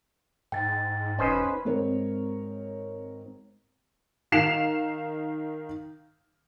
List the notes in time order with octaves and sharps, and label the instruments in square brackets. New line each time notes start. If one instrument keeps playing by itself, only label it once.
[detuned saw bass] G#2 [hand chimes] G5 A6
[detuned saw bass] E1 [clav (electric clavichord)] C#4 C5 D#5 [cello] D#4 B4
[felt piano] G#1 G#2 C4 A#4 C#5
[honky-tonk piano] D#3 F5 C7 E7 F7